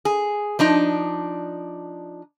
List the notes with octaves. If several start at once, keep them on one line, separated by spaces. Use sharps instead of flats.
G#4
F3 D4 D#4